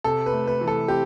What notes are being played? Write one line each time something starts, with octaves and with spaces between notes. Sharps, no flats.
C3 A4
B4
A3
B4
E3
A4
C4 G4